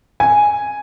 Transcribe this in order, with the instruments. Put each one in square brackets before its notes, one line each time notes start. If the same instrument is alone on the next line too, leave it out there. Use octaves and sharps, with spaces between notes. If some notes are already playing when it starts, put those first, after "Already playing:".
[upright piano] G#5